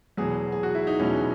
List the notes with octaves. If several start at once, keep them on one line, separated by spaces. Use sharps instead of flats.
E2 B2 F#3 G#4
G#4
F#4
E4
D#4
E2 B2 F#3 C#4